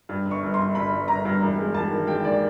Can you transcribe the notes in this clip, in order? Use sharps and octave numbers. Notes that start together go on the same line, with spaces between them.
G2
G1
C#6
G1
G1 C6
G1 B5
G1
G1 A#5
G2
E1
G#3
E1 A5
D#3
G#3 G5
D#2 D5